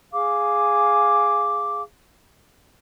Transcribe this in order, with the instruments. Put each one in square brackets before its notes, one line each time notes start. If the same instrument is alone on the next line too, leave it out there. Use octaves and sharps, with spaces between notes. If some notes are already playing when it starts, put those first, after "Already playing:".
[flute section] G#4 F5 D6